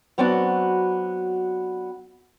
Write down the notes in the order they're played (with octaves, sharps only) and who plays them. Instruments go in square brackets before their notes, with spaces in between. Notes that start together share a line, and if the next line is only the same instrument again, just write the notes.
[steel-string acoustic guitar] F#3 B3 C4 D4 F#4